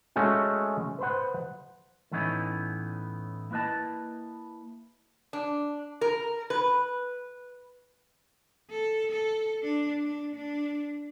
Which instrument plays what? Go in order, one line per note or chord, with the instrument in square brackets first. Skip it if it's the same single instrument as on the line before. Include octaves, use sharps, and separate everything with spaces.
[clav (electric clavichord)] G#3 A3 C#4 F#4
B4 C5 F#5
[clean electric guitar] A2 E3 B3 C#4 D#4 E4
A#3 E4 B4 D#5 A5
[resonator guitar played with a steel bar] D4
A#4
B4
[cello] A4
A4
D4
D4
D4